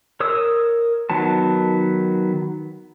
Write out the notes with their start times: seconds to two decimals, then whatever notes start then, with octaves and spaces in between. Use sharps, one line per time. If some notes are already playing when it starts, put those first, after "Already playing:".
0.20 A#4 C#5 D#6 E6
1.10 D#3 F#3 B3 A5